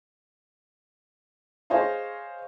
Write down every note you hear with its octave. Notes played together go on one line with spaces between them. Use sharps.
G#4 C5 C#5 D#5 F5